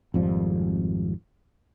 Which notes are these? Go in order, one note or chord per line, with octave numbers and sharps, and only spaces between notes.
G#1 F2 F3 G3